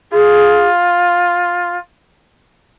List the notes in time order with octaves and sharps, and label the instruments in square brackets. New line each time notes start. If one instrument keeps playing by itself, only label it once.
[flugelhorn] F4 [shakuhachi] G#4